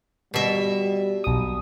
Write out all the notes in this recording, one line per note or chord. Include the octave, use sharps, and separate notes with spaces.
B2 G3 E5
B1 D#6